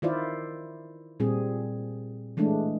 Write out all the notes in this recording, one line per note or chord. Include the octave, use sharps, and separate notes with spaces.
D#3 E4 F4 C5 D5
A#2 G3 C4 G#4
E3 G#3 A3 D4